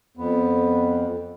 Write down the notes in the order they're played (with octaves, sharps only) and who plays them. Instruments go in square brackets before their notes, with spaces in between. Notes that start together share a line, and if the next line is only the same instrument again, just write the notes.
[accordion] F2 [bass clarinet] B3